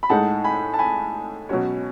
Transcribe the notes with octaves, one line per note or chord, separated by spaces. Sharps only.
B5
A2 G#3 D#4 G#4 F#5 A5
G#5 B5
A5
G#5 B5
B2 F#3 C#4 F#4 C#5